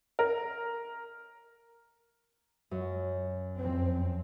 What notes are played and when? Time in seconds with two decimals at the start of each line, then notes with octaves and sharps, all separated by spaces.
0.19 A#4
2.71 F#2
3.58 F2 C4